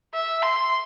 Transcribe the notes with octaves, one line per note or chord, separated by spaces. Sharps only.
E5
C6